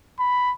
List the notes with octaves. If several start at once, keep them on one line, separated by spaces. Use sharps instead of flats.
B5